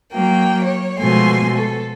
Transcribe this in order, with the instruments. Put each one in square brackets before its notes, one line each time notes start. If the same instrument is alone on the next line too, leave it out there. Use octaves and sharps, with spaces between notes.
[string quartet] F#3 A#3 G5
C#5
B2 F3 G#3 A3 G#5 C6
A4